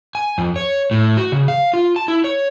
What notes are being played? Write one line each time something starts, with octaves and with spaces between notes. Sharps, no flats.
G#5
F2
C#5
A2
F#4
C#3
F5
F4
A5
E4
C#5